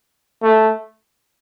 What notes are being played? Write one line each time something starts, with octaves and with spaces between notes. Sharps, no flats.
A3